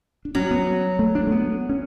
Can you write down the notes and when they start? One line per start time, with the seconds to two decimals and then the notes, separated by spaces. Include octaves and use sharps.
0.25 D4
0.35 F#3 C#4
0.51 B3
0.99 A3
1.15 D4
1.27 A3
1.31 B3
1.69 C#4